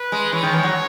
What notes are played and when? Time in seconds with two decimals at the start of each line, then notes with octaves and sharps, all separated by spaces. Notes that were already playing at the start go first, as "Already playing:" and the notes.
Already playing: B4
0.12 G#3
0.32 E3 C#5
0.43 D#3
0.53 E3
0.59 G#3
0.63 F#3